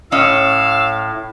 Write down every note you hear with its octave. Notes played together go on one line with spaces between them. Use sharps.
A2 C#4 D#5 F5 E6